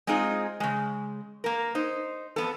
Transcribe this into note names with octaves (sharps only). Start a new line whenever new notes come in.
G#3 C4 D#4 F4 G#4
C#3 G#3
A#3 A#4
D#4 C5
F2 B3 A4